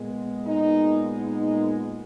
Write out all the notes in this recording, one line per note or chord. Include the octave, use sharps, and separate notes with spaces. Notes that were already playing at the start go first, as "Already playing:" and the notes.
Already playing: A#2 G#3 B3
D#4
D#4